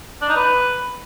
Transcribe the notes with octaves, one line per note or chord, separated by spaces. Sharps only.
D4
D#4
B4